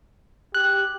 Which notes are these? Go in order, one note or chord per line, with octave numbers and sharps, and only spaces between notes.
G4 F#6